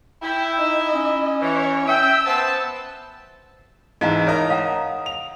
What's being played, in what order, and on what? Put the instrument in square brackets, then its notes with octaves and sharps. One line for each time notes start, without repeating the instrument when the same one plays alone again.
[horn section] E4 [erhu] G5
[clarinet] D#4 [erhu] D#5
[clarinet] C#4
[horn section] E3 [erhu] C#5
[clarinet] E5 [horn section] G5 [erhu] E6
[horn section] B3 A5 [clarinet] C5
[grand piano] G#2 E3 A5 [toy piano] D#5 F5 A#5
[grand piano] A#4 D#5 A#5 [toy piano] C#5
[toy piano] F5 F#5 A#5 [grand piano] D#6
[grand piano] F7